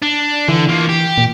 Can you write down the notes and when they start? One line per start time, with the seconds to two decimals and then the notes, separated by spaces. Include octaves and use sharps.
0.02 D4
0.49 D3 E3
0.69 F3 A#3
0.89 G4
1.18 A#2